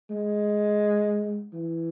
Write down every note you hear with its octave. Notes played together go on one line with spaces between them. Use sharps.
G#3
E3